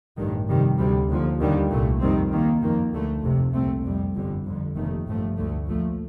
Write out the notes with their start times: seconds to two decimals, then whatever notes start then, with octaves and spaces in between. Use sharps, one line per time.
0.18 A1 G2 D#3
0.48 F2 C3 D#3 G3
0.79 D2 C3 G3
1.10 D#2 D3 F3
1.40 D#2 D3 G3
1.71 C2 A#2 A3
2.01 F2 D#3 G3 C4
2.32 D#2 D#3 A#3
2.62 F2 D#3 A#3
2.93 D2 D3 A3
3.24 F1 F2 C3
3.54 C2 A#2 A3 C4
3.85 F2 C3 G3
4.15 G1 F2 D3 G3
4.45 G1 F2 D3
4.76 F1 D#2 D#3 A3
5.06 A1 G2 F3 A3
5.37 D2 D3 A3
5.68 A#1 A#2 F3 A3